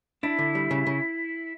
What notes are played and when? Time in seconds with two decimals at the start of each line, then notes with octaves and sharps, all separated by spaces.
0.23 D4 E4
0.39 D3
0.55 G3
0.71 C#3
0.87 C#3